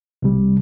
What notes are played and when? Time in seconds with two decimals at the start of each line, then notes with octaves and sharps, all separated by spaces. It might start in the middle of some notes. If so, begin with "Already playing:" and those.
0.22 C2 C3 G3